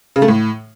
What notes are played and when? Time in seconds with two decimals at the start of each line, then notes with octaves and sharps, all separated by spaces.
0.16 C#3
0.22 A3
0.28 A2